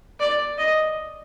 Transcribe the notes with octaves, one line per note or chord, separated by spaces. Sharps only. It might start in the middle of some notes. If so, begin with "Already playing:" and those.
D5
D#5